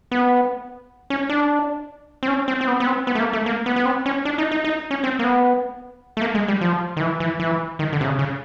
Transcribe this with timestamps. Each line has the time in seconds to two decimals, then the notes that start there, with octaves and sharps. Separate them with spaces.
0.11 B3
1.10 C#4
1.30 D4
2.23 C4
2.28 C#4
2.48 C4
2.61 C4
2.67 B3
2.80 B3
2.87 C4
3.07 B3
3.15 A3
3.20 A#3
3.33 A3
3.46 A#3
3.66 B3
3.76 B3
3.85 C4
4.06 C#4
4.25 D4
4.38 D#4
4.51 D#4
4.64 D#4
4.91 C#4
5.04 C4
5.19 A#3
5.24 B3
6.17 A3
6.22 A#3
6.35 G#3
6.48 G3
6.61 F3
6.97 D#3
7.01 E3
7.20 E3
7.40 E3
7.79 D#3
7.92 D3
8.01 C3
8.05 C#3
8.19 C#3